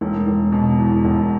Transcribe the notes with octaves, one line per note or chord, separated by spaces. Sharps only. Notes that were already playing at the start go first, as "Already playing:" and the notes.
E1
E1
B2
E2
E1